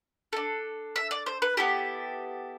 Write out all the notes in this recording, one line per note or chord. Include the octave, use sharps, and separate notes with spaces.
D4 A4
E5
D5
C5
B4
B3 E4 G4 A4